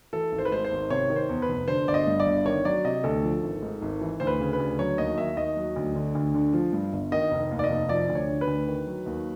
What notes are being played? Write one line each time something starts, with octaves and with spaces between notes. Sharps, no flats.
E3 A4
G#1
C5
B4
G#2 C5
C5
G#1
C3 C#5
D#3
C5
E2
B4
F1
D3 C5
G1 D5
D#5
G2
D5
G1
D#3 C#5
F#3 D5
C3 D#5
D2 A4
F3
G#1
G#2
G#1
E3
D2 C5
B4
C#3
B4
D2
F#3 C#5
D#2 D#5
D#3 E5
D#2 D#5
F#3
D2
D3
D2
D3
F3
G2
G1
D#3 D#5
F1
D#2
D5
D#5
F1
F3 D5
D2
C#5
D3
B4
D2
D#3
F#3
D#2